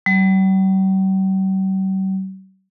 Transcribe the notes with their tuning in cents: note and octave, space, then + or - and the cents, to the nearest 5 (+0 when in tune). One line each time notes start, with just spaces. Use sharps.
G3 -45